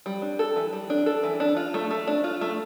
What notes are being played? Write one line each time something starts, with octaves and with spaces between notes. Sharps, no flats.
G3
D4
A4
E3
G3
D4
A4
E3
D4
F4
A3
A3
D4
F4
A3